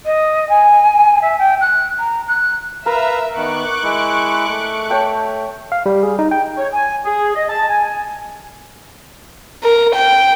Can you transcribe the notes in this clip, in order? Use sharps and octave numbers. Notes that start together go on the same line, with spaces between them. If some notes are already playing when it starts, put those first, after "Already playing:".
D#5
G#5
E5
G5
F#6
A#5
F#6
A#4 B4 E5 F5 A#5
D#3 B3 C#6 D6 F#6
G#3 E4
A3
C#5 G5 A5
F5
G3
G#4
D#4
G5
C#5
G#5
G#4
D#5
A5
G#5
A#4
G5